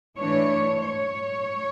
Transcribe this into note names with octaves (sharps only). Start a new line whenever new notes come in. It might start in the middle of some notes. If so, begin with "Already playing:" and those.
E3 A3 D4 C#5
C#5